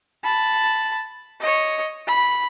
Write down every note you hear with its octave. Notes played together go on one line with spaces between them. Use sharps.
A5 B5
C#5 D#5
B5